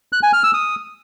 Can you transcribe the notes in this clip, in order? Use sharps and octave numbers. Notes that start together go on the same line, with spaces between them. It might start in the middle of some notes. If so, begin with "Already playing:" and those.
F#6
G#5
F6
E6
D#6